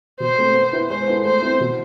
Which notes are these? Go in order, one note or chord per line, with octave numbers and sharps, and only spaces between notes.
B2 C5
A3 C4
B3
E4 B4 E5
G#3 C5
B3 E4 A4
A3 C5
C4 E4
B2